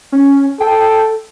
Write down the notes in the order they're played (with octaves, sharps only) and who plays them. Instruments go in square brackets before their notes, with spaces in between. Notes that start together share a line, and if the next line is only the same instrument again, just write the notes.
[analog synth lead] C#4
[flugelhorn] A4 [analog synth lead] G5